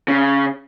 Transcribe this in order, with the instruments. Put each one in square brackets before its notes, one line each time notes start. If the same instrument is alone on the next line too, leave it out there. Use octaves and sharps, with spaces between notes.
[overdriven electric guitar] C#3